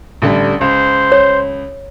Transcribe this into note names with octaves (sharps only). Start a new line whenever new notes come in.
A1 D3 G3
C#2 C5
C#5